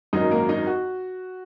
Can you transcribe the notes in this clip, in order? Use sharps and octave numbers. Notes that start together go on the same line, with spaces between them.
G#1 F#2 F#3 D#4 D#5
A#3 A#4
D#4 D#5
F#4 F#5